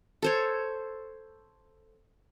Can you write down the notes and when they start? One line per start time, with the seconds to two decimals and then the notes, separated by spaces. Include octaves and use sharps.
0.22 A4 C5 C#5